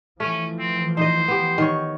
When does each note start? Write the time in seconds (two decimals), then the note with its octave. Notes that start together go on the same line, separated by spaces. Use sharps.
0.20 E3 F3 A3 C#4
0.59 C4
0.97 D#4 C5 D#5
1.28 B3 G4
1.58 D#3 C#5